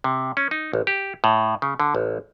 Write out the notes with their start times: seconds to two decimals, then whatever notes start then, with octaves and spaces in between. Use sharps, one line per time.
0.04 C3
0.37 C#4
0.51 D#4
0.73 A1
0.87 G4
1.24 A2
1.62 C#3
1.80 D3
1.95 A1